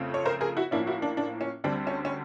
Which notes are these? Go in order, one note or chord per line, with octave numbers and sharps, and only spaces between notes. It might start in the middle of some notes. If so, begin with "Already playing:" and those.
Already playing: F2 C#3 F3 A3 C4
C#5
A#4 C5
G#4 A#4
E4 F#4
A2 F3 A#3 C#4 D4 E4
E4 F#4
D4
D4
C#4
D2 D3 G3 C4 D4
C#4
C#4